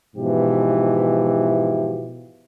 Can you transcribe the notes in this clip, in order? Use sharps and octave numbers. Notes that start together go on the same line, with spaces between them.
G#2 B2 E3 F3 G4